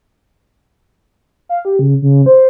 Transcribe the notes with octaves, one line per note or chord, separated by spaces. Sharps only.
F5
G4
C#3
C#3
C5